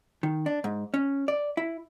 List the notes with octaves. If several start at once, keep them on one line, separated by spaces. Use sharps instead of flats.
D#3
D4
G#2
C#4
D5
E4